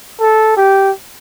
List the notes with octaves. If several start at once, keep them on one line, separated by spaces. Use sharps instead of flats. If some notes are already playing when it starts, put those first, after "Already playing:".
A4
G4